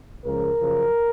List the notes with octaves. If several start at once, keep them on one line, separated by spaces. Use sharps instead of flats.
C#2 C#3 F3 A#4
F#2 C#3 F3